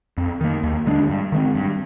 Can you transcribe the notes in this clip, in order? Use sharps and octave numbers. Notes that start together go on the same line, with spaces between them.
F2
D#3 A#3
D#2
D3 G#3 D4
G2
D#3 G#3 C4
G2